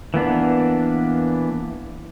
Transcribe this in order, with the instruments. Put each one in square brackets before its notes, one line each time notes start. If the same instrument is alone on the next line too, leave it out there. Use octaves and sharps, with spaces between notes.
[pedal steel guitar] E3 A#3 B3 D4